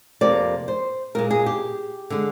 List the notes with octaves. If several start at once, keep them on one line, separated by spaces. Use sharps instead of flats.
F2 C3 F3 A#3 D5
C5
A#2 G#3 A#4
G#4
G4
D3 G#3